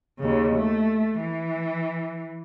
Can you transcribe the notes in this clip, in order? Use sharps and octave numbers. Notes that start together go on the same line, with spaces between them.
D#2 C#3
A3
E3